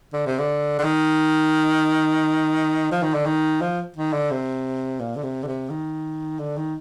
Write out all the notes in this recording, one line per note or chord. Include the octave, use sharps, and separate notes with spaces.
D3
C3
D3
D3
D#3
F3
D#3
D3
D#3
F3
D#3
D3
C3
A#2
D3
C3
D3
C3
D#3
D3
D#3